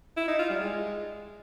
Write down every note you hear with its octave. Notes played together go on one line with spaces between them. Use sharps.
E4
D#4
F4
G3
G#3